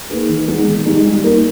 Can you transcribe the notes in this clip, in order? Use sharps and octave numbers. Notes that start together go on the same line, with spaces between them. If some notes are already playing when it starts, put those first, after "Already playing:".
A#3 D#4 G#4 B4
D#3
G#3 B3 D#4 G#4
D#3
G#3 B3 D#4 G4
G3
A#3 D#4 A#4